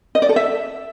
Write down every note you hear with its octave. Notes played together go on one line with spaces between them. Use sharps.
D#5
D5
A4
E5